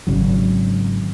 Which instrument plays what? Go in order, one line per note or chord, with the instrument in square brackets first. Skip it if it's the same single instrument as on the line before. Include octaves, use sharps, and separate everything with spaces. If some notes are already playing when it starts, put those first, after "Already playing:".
[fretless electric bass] G#1 C#3 F#3